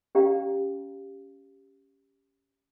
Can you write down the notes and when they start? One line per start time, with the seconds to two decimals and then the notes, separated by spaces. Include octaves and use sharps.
0.15 C#4 G4 D5 F5 A#5